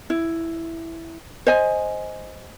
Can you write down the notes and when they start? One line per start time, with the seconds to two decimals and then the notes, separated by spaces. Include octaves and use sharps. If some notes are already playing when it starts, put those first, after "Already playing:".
0.10 E4
1.47 C5 D#5 G#5